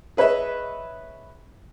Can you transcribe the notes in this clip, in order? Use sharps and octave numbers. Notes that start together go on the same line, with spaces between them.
G#4 B4 C#5 D#5 E5